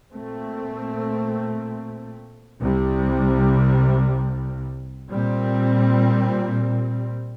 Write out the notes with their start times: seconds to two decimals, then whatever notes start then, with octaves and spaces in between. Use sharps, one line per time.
0.13 A#2 A3 C4
2.61 C2 C3 G3
5.10 A#2 G3 C4